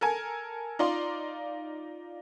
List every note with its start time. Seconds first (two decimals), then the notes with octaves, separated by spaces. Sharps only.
0.01 A4 A#4 G#5
0.79 D#4 F4 D5 C6